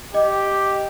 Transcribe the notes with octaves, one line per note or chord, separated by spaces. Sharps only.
G4 D#5